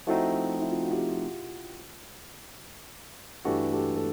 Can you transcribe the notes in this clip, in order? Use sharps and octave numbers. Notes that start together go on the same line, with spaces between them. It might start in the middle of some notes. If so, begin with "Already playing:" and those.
F3 A3 C4 D#4 E4 F#4
E4
F4
F#4
F4 G4
G2 E3 A3 D4 F#4 G4 A4
G4 A4
A4